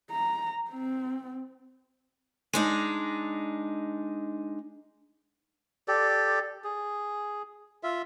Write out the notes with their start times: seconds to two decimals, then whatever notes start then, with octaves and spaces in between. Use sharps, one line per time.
0.11 A#5
0.70 C4
2.53 G#3 D4 D#4
5.88 G4 A4 D5
6.64 G#4
7.83 F4 E5